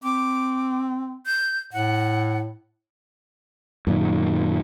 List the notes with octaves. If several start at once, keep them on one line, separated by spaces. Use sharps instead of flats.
C4 D6
G6
A2 F#5
F#2 A#2 D#3